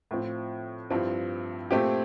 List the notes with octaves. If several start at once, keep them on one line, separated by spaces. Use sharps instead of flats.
A2 F3 C4
G2 F3 C4 E4
A#2 A3 C4 G4